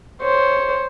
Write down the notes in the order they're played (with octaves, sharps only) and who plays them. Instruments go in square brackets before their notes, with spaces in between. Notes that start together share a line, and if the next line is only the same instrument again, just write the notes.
[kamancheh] C5 C#5